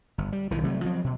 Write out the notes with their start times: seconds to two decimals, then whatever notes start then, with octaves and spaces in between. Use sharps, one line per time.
0.18 G1
0.32 G3
0.50 B1 A#2 D#3 E3
0.63 C3 F#3 G3 A3
0.84 F3 F#3 C4
1.04 B2